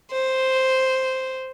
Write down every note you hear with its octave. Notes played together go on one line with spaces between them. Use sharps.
C5